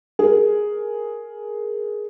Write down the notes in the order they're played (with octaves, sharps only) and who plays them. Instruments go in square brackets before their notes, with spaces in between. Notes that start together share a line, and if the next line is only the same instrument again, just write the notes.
[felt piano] G#4 A#4